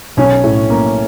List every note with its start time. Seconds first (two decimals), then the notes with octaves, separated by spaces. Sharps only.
0.17 B1 C#4
0.44 A2
0.70 A#3